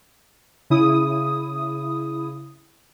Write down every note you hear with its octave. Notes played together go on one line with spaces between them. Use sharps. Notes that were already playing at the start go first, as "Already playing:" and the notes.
C#3 E4 D#6